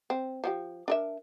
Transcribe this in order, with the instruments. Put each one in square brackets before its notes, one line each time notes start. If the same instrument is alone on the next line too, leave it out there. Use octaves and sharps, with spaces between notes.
[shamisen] C4
F3 F#4 G4
D4 A#4 E5